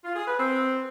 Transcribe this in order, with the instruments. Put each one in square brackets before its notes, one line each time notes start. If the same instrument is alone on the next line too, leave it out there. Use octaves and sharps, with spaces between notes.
[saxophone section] F4
G#4
B4
C4